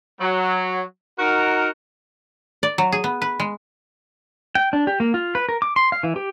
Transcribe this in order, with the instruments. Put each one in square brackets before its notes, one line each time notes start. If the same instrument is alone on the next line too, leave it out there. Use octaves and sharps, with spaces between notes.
[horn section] F#3
D#4 F#4 A#4
[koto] D5
F#3
G#4
B3
B4
G#3
[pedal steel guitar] G5
D4
G4
A#3
F4
B4
A#4
D6
C6
F5
E3
G4